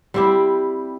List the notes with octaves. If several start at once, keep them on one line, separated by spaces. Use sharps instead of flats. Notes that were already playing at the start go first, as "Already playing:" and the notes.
G3 C4 E4 G4